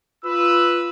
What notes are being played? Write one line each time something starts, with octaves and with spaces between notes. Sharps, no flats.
F4 B4 E6